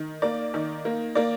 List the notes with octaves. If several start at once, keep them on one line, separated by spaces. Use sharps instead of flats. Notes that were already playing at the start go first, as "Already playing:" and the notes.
Already playing: D#3
A#3 D5
D#3
A#3
A#3 D5